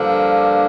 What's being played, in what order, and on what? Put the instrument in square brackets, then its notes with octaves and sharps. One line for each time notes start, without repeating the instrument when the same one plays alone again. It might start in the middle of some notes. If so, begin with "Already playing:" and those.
Already playing: [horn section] G2 D3 F3 A#3 D4